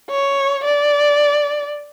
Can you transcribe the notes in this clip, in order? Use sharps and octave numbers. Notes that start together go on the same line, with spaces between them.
C#5
D5